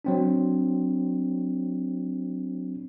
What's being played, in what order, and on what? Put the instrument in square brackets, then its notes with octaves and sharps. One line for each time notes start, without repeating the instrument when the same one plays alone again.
[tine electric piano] F#3 C4 D4